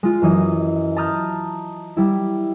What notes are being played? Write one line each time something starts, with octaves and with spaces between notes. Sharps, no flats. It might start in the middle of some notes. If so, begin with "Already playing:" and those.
G#3 F4
F#2 E3 D#5
A5 A#5 D#6 F6 G6
G3 E4